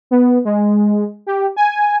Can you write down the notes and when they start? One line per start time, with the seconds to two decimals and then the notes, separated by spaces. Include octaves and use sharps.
0.11 B3
0.45 G#3
1.27 G4
1.56 G#5